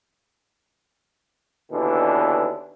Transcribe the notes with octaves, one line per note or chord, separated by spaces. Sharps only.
D#2 B2 D3 E3 D4